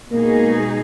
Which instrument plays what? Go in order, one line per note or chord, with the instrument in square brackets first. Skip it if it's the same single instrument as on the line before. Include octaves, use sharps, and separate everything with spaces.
[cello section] B2 G#3 D#4 G#4 [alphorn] A#3